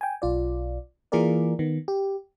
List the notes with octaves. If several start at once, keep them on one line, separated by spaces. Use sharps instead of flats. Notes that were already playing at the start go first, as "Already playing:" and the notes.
G5 G#5
B1 F4 D5
E3 A#3 F4 G#4 A#4 D5
D#3 B3
G4